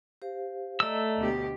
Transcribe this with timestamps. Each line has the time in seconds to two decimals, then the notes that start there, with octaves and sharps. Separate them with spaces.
0.22 G4 C5 F5
0.80 A3 D5 D#5 A#5 E6
1.18 D2 B2 G4